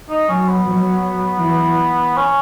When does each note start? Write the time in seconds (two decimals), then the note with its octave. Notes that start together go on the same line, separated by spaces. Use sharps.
0.09 D#4
0.28 F#3 C#4
0.47 B3
0.67 F#3
1.41 E3
2.16 C#4